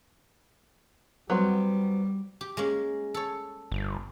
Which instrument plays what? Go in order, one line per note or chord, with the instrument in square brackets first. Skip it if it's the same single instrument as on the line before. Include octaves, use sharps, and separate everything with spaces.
[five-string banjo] F#3 B3 C4 [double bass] G3
[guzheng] G4
G#3 A#3 C#4
A4 C#5
[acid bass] G1